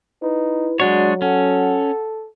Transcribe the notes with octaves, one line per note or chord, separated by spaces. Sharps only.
D#4 E4 B4
F#3 G#3 D4 F#4 C#5 D5
C#4 A4 F#5